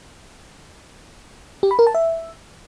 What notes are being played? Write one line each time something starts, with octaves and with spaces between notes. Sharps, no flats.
G4
B5
A#4
A5
E5